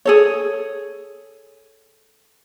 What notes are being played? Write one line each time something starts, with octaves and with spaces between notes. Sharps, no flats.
G#4 A4 C#5